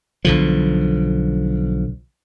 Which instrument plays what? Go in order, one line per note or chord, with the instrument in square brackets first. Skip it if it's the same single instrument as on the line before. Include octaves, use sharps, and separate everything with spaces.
[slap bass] B1 D3 F3